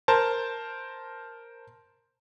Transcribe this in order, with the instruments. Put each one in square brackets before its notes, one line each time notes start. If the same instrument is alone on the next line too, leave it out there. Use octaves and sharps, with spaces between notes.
[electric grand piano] A#4 C5 A5